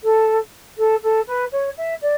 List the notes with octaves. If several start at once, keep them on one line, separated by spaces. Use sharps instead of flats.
A4
A4
A4
B4
C#5
E5
D5